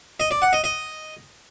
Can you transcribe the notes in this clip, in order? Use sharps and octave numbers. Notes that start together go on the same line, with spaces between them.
D#5
D5
F#5
D#5
D#5